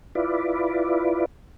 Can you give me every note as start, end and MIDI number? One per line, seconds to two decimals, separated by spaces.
0.15 1.25 64
0.15 1.25 65
0.15 1.25 71
0.15 1.25 74